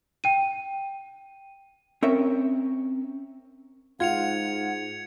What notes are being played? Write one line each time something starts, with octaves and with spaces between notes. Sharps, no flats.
G5 D#7
C4 C#4 A#4 E5
G#2 F4 F#5 G#6 C#7 F7